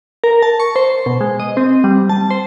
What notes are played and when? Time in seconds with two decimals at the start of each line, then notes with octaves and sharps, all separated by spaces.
0.24 A#4
0.42 A5
0.60 C#6
0.76 C5
1.06 B2
1.21 G#3
1.40 D#5
1.57 C4
1.84 G3
2.10 A5
2.31 C5